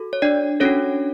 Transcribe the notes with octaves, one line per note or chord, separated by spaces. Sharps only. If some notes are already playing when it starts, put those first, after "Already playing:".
Already playing: F#4 A4
C#5
D4 D5
C#4 D4 F#4 A4 C#5